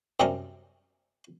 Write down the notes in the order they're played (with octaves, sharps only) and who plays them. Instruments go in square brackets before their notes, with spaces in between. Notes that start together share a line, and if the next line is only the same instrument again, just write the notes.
[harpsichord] F#2 C3 G3 C#4 A#4